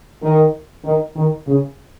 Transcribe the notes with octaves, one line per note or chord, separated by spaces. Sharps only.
D#3
D#3
D#3
C#3